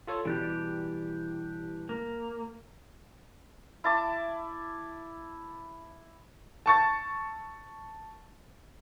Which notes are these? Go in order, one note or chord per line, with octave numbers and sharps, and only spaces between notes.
F4 A4 C#5
B2 E3 G3 D4 G4
A#3
E4 A5 D6
A5 C#6 A6